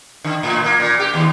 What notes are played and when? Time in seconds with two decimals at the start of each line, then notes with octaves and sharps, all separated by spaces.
0.24 D3
0.43 A2
0.64 A#3
0.80 A#2
0.99 G4
1.14 D#2